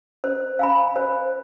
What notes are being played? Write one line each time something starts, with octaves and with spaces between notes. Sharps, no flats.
C5
F5 G#5 B5
C5